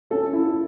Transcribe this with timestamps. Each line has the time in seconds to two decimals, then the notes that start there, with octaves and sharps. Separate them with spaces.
0.10 C#4 A4
0.33 E4